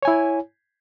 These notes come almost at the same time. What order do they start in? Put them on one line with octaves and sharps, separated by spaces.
C#5 G#5 E4